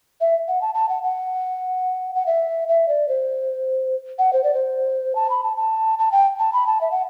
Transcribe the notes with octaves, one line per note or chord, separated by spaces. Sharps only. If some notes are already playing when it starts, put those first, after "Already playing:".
E5
F#5
A5
A5
F#5
F#5
F#5
E5
E5
D5
C5
F#5
C5
D5
C5
A5
B5
A5
A5
A5
G5
A5
B5
A5
E5
F#5